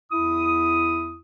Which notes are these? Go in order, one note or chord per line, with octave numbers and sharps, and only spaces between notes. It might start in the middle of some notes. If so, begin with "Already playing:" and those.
E2 E4 D#6